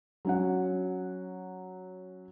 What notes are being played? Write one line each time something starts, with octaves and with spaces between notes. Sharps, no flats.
F#3 C#4 F#5